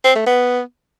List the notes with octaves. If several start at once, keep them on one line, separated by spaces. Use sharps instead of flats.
C4
A3
B3